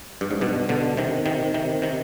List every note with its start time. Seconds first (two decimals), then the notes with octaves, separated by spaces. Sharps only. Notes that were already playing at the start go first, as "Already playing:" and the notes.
0.21 G2
0.31 G#2
0.41 G2 B2
0.69 B2 D3
0.97 C3 D#3
1.26 C3 D#3
1.54 C3 D#3
1.82 C3 D#3